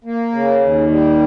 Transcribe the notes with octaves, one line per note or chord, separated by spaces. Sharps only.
A#3
C#3
D#2
G3